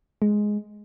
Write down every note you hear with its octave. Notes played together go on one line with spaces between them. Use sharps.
G#3